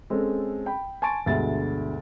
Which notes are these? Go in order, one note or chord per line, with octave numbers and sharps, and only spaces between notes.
G#3 C4 C#4 A4
G5 B5
G#5 A5 C6 C#6 A6 D7
D2 G2 B2 G#3 E5 A6